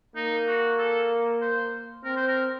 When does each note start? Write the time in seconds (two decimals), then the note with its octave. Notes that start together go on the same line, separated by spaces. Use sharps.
0.16 A#3 D#4
0.48 F#4
0.79 A4
1.42 C5
2.04 C4 A#4
2.17 C5
2.28 A#4